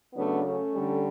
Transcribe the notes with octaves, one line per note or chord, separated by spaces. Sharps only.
C#3 F#3 A3 B3 D4
A3 C#4
D3 G3